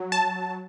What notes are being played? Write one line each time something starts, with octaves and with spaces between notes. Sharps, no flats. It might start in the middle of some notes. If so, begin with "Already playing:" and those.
Already playing: F#3
A5